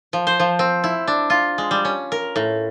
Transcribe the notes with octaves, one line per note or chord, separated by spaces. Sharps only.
F3
C5
F3
C4
E4
D4
F4
G#3
G3
C#4
A#4
A2